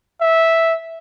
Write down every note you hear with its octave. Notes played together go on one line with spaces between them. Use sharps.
E5